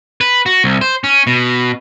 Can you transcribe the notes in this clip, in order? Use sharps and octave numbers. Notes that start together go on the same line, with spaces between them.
B4
F#4
C2
C5
C#4
B2